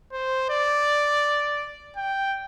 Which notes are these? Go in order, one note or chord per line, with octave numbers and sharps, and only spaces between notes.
C5
D5
G5